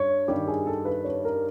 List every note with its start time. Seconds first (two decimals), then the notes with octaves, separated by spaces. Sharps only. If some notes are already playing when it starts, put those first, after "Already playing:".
Already playing: G2 C#5
0.28 G2 D#3 G3 G4
0.47 G#4
0.66 A4
0.85 B4
1.04 C#5
1.25 A#4